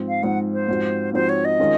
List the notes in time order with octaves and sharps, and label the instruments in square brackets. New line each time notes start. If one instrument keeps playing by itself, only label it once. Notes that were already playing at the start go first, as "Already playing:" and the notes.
Already playing: [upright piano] G#2 F3 C4
[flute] F5
[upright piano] G#2 F3 C4 [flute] F#5
[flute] C5
[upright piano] G#2 F3 C4 F#4
[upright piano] G#2 F3 C4 F#4 [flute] C5
[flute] C#5
D#5
[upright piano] D#3 G#3 C#4 F4